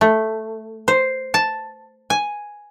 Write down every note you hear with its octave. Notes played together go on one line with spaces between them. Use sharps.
A3
C5
A5
G#5